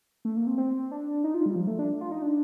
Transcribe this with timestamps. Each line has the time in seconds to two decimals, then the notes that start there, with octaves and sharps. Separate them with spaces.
0.25 A3
0.37 A#3
0.47 C4
0.58 C4
0.91 D4
1.24 D#4
1.34 F4
1.46 G3
1.56 F3
1.67 A3
1.79 D4
2.01 F4
2.12 D#4
2.22 D4